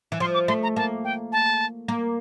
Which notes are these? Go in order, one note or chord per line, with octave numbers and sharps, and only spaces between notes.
E3
F3 C6
D6
A3 C6
A#5
A#3 A5
G5
A5
A#3